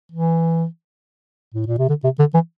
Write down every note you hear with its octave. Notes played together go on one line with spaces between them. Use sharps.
E3
A2
A#2
C3
D3
C3
D3
E3